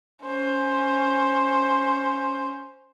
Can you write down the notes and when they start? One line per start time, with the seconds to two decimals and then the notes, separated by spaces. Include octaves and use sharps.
0.24 C#4 C5